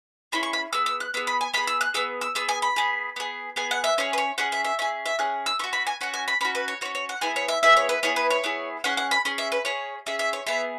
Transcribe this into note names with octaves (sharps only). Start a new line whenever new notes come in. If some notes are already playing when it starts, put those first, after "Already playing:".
C#4 E4 G#4 B5
C#6
B5
B3 G#4 E6
E6
F#6
B3 G#4 E6
B5
G#5
B3 G#4 B5
E6
F#6
B3 G#4 E6
E6
B3 G#4 E6
G#5
B5
B3 G#4
B3 G#4
B3 G#4 G#5
F#5
E5
C#4 G#4 C#5
B4
C#5
C#4 G#4 F#5
E5
E5
C#4 G#4 E5
E5
C#4 G#4 F#6
E6
C#4 F#4 C#6
B5
G#5
C#4 F#4 F#5
G#5
B5
C#4 F#4 B5
B4
C#5
C#4 F#4 C#5
C#5
F#5
B3 E4 G#4 G#5
C#5
E5
B3 E4 G#4 E5
C#5
B4
B3 E4 G#4 C#5
B4
C#5
B3 E4 G#4
C#4 G#4 F#5
F#5
B5
C#4 G#4
E5
B4
C#4 G#4 C#5
C#4 G#4 E5
E5
C#5
B3 G#4 E5